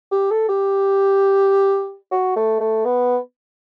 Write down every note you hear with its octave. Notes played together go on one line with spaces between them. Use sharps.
G4
A4
G4
F#4
A3
A3
B3